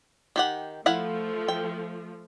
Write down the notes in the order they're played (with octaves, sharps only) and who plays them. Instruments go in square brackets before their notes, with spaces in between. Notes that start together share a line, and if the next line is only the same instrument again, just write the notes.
[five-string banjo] D#3 G4 F#5
[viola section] F3 A3 [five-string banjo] E4 F5 F#5
[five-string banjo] G5